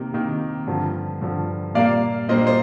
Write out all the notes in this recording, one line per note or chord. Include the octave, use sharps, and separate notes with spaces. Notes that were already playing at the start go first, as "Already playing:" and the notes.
Already playing: C3 D#3 A#3
C3 D#3 A#3
G2 D3 F3
G2 D3 F3
A#2 G3 A#3 D5 F5
A#2 G3 A#3 C5 D#5
C5